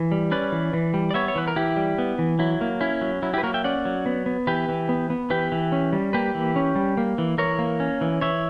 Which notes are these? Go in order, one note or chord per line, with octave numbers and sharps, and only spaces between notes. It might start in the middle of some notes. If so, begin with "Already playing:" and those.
Already playing: E3
G3
C#4 B4 D5
E3
E3
G3
D5
B3 C#5 E5
C#5
E3 B4
A#4
E3 E4 G4
G3
B3
E3
F#3 E4
A#3
C#4 E4
F#3
F#3 E4
E4 G4
B4
A#3 F#4 A#4
E5 G5
C#4 D5 F#5
F#3
B3
B3
E3 G4 B4
E3
B3
B3
E3 G4 B4
E3
C#4
G3
A#3 G4 B4
E3
C#4
G3
A#3
E3
E3 A#4 C#5
A#3
C#4
E3
E3 C#5 E5